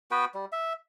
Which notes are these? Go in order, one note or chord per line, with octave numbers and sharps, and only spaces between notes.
B3 F#4 B4 G5
G3
E5